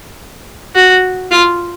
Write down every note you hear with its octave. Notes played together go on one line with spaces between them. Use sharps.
F#4
F4